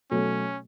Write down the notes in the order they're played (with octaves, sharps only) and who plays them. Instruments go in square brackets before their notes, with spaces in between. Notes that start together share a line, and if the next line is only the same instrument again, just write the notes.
[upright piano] B2 F#3 A3 [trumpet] C#4